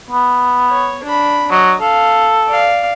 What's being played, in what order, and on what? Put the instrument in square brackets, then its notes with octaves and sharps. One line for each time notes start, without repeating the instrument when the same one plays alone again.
[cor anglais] B3
[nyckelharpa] C#5
D4 B5
[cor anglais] F#3 [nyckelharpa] D#5
[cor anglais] A4 [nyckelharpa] F5
[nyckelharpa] D5 F5